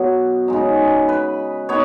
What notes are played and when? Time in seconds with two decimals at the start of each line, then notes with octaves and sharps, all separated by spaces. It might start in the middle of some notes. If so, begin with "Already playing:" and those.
Already playing: B2 F#3 B3
0.48 C#3 G#3 D#4
1.09 B4
1.69 B3 D#4 C#5